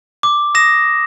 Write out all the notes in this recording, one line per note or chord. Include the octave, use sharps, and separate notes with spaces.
D6
D#6 A#6 E7